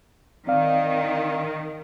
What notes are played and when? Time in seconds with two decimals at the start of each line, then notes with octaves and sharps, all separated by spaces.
0.47 D#3 C4 D5 F5